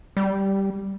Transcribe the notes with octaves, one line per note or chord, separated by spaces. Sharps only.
G3